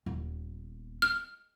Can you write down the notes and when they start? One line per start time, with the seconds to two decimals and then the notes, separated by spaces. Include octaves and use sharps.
0.06 D#1 B3
1.02 F6